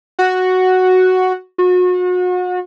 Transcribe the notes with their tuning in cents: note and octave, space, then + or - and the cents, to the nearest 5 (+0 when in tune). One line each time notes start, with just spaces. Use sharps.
F#4 +0
F#4 -35